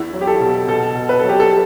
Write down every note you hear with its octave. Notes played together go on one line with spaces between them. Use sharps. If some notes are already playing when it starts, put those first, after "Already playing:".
Already playing: E2 E4
F#3
G4
A4
B2
B2 A4
B2
B4
F#3 A4
G4
A4